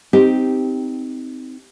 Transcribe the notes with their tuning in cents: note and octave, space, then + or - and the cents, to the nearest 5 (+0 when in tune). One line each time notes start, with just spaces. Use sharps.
C4 -15 D#4 +0 G4 +0